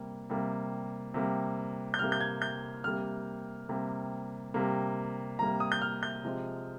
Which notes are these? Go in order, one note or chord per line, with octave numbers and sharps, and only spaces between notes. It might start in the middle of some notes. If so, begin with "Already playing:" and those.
Already playing: C3 G3 A#3
C3 G3 A#3
C3 G3 A#3
G6
C3 G3 A#3 F6
G6
G#6
G6
C3 G3 A#3 F6
C3 G3 A#3
C3 G3 A#3
C3 G3 A#3 A#5
D#6
G6
F6
G6
C3 F3 G#3